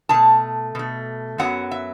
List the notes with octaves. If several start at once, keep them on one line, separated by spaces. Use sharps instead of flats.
B2 A3 A5
B2 A3
F#2 F#3 B3 F#5
E5